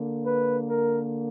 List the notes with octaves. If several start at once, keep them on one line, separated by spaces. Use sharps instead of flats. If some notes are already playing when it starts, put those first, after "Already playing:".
Already playing: D3 A#3
B4
A#4